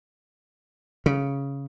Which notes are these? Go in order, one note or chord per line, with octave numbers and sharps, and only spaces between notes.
C#3